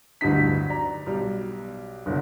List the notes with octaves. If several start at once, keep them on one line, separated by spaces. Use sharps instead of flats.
D1 D2 G2 D3 D#4 B6
D5 A#5
B1 G3
F#1 B1 D3